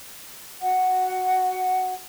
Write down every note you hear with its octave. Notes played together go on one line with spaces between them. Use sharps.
F#4 F#5